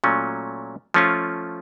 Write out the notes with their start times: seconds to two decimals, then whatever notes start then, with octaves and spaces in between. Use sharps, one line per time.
0.04 A#2 F#3 A3 C#4
0.94 F3 A3 C#4 F4